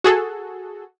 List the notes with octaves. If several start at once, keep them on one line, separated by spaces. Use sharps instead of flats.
F#4 G#4 A4